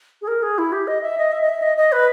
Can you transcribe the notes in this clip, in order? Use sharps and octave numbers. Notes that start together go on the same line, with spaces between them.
G#4
A#4
G#4
E4
G4
D#5
E5
D#5
E5
D#5
E5
D#5
D#5
B4